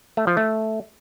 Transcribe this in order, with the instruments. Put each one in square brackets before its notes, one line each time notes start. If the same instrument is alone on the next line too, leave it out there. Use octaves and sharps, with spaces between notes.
[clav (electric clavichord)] A3
F3
A3